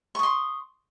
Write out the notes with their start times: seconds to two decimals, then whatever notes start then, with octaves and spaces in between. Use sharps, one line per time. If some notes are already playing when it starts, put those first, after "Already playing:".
0.15 C#6
0.19 D#6
0.23 C6